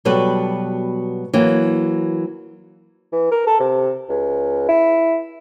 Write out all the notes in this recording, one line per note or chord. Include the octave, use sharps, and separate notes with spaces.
B2 F#3 G3 B3 A4 B4
E3 F#3 A#3
E3
A#4
A4
C3
C#2
E4